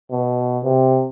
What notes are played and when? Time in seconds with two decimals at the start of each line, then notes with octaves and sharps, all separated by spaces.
0.11 B2
0.64 C3